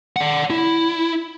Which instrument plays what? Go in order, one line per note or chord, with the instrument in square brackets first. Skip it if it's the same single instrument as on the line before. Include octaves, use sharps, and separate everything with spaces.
[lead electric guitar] D5 F#5
E4